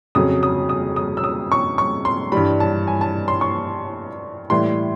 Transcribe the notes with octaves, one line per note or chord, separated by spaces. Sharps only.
F2 C#3 F#3 D#6
D#6
D#6
D#6
E6
D#6
C#6
C#6
C6
G2 E3 G3 B5
A5
G#5
A5
C6
C#6
A2 E3 G3 C6